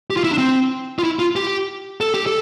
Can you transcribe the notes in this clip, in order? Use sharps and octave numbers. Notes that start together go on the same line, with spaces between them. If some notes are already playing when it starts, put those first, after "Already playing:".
G4
F4
E4
D4
C4
F4
E4
F4
G4
A4
G4
A4